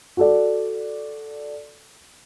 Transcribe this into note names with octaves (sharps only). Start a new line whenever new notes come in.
F#4 A4 D5